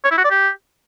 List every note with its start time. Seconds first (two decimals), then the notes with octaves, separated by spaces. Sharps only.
0.04 C#5
0.11 E4
0.17 F#4
0.24 D5
0.31 G4